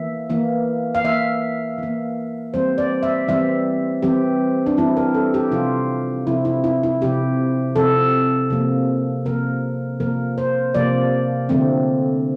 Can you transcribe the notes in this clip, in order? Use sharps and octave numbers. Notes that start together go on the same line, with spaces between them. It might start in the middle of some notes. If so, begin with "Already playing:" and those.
Already playing: E3 A#3 E5
E3 A#3
F5
E3 A#3 E5
E3 A#3
E3 G3 C4 C5
D5
E5
E3 G3 C4 E5
E3 G3 C4 G4
D4
E3 G3 C4 E4
A#4
A4
G4
C3 F3 C4 F4
C3 F3 C4 E4
E4
E4
E4
C3 F3 C4 G4
C3 F3 C4 A4
C3 F3 A#3
C3 F3 A#3 A#4
C3 F3 A#3 A#4
C5
C3 F3 A#3 D5
D3 F3 A3 C4